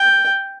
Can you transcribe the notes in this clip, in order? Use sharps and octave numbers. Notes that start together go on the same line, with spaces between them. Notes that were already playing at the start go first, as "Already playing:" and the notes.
Already playing: G5